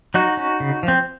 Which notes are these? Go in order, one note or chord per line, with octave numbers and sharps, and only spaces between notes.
F#3 D#4 F#4
C#4
C#3
F3
C4